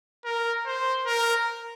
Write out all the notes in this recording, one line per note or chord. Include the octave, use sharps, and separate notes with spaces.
A#4
C5
A#4